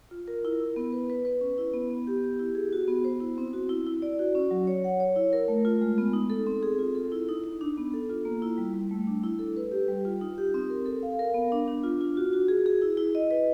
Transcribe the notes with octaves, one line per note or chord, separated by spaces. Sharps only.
F4
A#4
E4
E4
B3
B4
B4
B4
C#4
E4
B3
B3
G4
G4
E4
G#4
F#4
B3
C5
E4
C4
F#4
E4
E4
D5
F#4
C#4
F#3
C#5
F#5
C#5
E4
A#4
A3
F4
G#3
B3
D#4
A4
C4
G#4
F4
A4
E4
D#4
D#4
D4
B3
A4
F4
A#3
E4
G3
G3
A3
D4
E4
A4
B4
G4
G3
F4
D#4
G4
C4
A#4
A4
F5
A#4
B3
D4
D4
F4
F4
F#4
F#4
G#4
G#4
E4
E4
D#5
B4